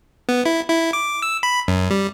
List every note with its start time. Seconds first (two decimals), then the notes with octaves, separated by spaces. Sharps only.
0.29 B3
0.45 E4
0.68 E4
0.93 D6
1.22 E6
1.43 B5
1.68 F#2
1.91 G3